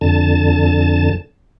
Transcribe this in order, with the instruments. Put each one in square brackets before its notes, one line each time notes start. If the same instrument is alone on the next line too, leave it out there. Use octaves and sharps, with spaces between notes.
[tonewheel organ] F2 D3 A5